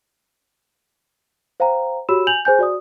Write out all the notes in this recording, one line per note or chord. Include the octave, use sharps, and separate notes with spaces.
C5 F5 G5 A#5
F#4 G4 C#5 B5 E6 E7
G#5 G6 F7 F#7
G#4 C5 G#5 G6
F#4 D5 D#6